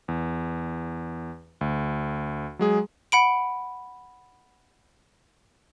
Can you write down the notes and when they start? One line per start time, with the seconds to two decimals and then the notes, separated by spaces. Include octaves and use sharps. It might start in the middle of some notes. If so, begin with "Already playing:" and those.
0.08 E2
1.61 D2
2.59 F#3 G#3 G#4
3.12 F#5 B5 D7